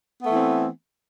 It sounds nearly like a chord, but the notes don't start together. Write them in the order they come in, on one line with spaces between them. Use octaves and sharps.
B3 A3 E3 C4